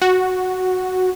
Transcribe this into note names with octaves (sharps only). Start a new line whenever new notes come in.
F#4